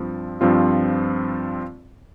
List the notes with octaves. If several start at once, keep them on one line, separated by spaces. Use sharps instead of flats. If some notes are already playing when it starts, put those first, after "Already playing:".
Already playing: G2 F3 C4
G2 F3 C4 F4